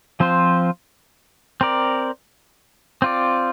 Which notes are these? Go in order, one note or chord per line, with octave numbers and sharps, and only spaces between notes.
F3 C4 F4 C5
C4 A#4 D5
C4 F4 D5